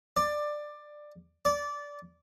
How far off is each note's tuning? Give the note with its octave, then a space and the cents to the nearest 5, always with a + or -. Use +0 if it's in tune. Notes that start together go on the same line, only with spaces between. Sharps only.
D5 +15
D5 -15